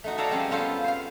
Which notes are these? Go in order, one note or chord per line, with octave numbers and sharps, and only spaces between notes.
A3 D#4 F#4
A4 C#5 D5 F5 A5 A#5
F3 G3 G#3 C4 C#4
B3 C#4 F4 A4 C5
C5 F5